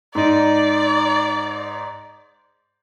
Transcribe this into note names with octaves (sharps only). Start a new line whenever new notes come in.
G#2 D#4 D5